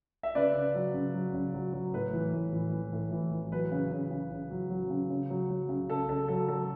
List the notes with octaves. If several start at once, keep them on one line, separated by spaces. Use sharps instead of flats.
E5
C#3 B4 D5
C#3
F#3
C#3
F#3
C#3
F#3
F#3
A2 B4
E3
A2
E3
E3
A2
E3
E3
F#3 B4
C#3
C#3
C#3
C#3
F#3
F#3
C#3
C#3
F#3
F#3
C#3
C#3 A4
C#3 A4
F#3 A4
F#3 A4